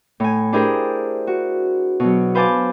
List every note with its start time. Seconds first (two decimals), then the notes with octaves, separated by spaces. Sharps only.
0.20 A2 G#5
0.53 D4 E4 G4 G#4 A#4 C5
1.27 F#4
2.00 B2 F#3
2.35 B4 C5 F5 G#5 A5 D6